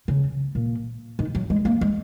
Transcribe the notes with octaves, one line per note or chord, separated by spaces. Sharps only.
C#3
A#2
D#3
F#3
G#3
A#3
G#3